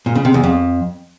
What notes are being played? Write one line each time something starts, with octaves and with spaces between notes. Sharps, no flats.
A#2
C#3
C3
E2
F2